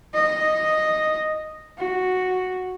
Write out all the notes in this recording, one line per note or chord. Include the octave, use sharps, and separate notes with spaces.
D#5
F#4